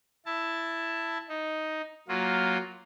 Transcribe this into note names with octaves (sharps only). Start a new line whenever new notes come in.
E4 A5
D#4
F#3 A#3 F4